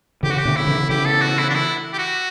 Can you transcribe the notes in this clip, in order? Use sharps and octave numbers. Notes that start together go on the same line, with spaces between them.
C#3 E3 G4
F#4
G4
B2 D3
E4
C#3 E3
C#3 E3 G4
A4
F#4
E4
D4
E4
G4
F#4